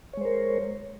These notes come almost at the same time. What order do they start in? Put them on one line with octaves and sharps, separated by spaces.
C#5 G#3 C5 A#4